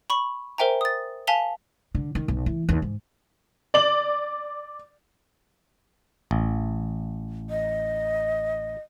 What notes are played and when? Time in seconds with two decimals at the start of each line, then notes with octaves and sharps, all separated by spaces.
0.10 B5 C#6 F#7
0.58 A#4 C5 E5 G5 G#5 A#5
0.81 D#6 A6
1.27 F5 G#5 A5 B6 F7 G7
1.95 D3
2.15 D#3
2.28 B1
2.46 E3
2.69 D#2
2.82 G#2
3.74 D5 F#7
6.31 A1
7.50 D#5